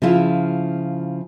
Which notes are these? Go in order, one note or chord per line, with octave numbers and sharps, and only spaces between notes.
C#3 F3 E4 F4